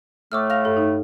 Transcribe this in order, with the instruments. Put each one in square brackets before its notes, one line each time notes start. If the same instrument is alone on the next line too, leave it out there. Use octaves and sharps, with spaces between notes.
[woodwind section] A2 A3 [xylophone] D6 E6 F6
[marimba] F5 [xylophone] F6 A#6 F7
[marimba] G2 [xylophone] A4
[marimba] D#4